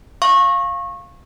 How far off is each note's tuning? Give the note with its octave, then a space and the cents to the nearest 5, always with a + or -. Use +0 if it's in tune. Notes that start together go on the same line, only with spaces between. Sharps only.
F5 +0 C#6 -25